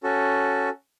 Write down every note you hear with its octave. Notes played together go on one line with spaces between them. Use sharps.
C#4 F#4 A4